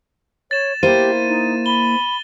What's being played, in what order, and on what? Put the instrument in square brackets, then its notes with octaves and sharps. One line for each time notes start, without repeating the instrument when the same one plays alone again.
[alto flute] C#5 [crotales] A6 E7
[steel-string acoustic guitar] A#3 E4 C5 [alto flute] G4 [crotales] D#7
[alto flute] D#4
[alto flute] B5 [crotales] G7